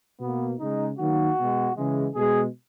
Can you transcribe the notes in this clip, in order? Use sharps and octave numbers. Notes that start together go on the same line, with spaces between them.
B2 A#3 B3
C#3 G#3 D#4
D#3 F#3 A#3 F#4
B2 G#3
C#3 E3 G#3
B2 G#3 G#4